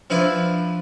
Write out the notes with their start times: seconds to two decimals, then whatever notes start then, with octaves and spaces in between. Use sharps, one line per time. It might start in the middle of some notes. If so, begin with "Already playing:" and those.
0.10 F3 C4 D4 E4 B4